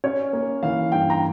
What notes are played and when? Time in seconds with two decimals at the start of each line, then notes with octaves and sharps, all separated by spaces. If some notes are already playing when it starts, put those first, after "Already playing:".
0.04 C#4 C#5
0.33 A#3
0.63 E3 F5
0.92 G2 G5
1.10 A#5